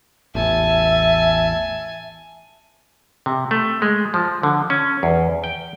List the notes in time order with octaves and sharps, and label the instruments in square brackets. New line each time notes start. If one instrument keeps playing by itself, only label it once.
[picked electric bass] A1 E2 [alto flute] E5 [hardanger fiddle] G#5 A5
[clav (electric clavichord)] C3
A3
G#3
F3
D3
C#4
E2
G5